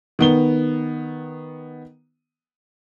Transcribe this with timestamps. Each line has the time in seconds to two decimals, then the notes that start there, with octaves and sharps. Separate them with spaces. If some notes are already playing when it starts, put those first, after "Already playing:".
0.19 D#3 B3 G7